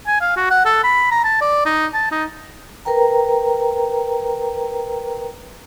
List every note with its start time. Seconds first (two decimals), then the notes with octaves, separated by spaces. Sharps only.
0.07 G#5
0.21 F5
0.37 F#4
0.51 F#5
0.65 A4
0.84 B5
1.12 A#5
1.24 A5
1.41 D5
1.66 D#4
1.94 A5
2.12 D#4
2.85 A#4 B4 G5 A#5